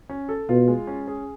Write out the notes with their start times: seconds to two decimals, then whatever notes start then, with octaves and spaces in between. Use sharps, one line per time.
0.09 C#4
0.29 A4
0.49 B2 F4
0.68 G#3
0.87 C#4
1.07 G#4